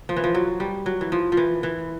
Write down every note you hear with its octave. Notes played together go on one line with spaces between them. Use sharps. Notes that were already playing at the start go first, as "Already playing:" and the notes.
F3
E3
F3
F#3
G3
F#3
E3
F3
F3
E3
E3